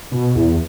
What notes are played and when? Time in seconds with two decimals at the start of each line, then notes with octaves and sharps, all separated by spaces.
0.11 B2
0.35 E2